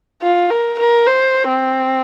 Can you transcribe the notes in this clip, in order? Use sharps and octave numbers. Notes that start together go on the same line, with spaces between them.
F4
A#4
A#4
C5
C4